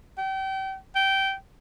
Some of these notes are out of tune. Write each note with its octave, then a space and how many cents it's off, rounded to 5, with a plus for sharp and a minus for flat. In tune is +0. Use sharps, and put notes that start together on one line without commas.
G5 -35
G5 -15